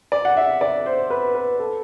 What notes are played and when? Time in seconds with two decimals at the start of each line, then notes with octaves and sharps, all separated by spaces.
0.12 D5
0.25 F#5
0.37 E5
0.61 D5
0.86 C5
1.10 B4
1.35 B4
1.59 A4